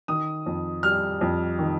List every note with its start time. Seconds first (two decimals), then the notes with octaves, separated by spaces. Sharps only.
0.08 D#3 D#6
0.46 F2
0.83 G3 F6
1.21 F2
1.59 D#3